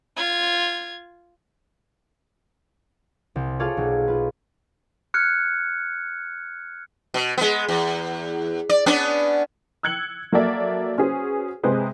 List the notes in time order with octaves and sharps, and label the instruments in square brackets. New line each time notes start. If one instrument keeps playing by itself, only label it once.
[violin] F4 G#6
[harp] C2
F4 G#4 A4 C#5 D5 F5
B1
F4 B4
[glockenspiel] F6 F#6 G#6 C#7
[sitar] B2
G#3 B3
E2
D5
B3 C#4 D4
[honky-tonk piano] E6 F#6 G#6 C#7 F#7
F#3 A#3 F#4 A4 D5 E5
C#4 F#4 G#4 B4 C5
C3 G#3 G#4 B4 C5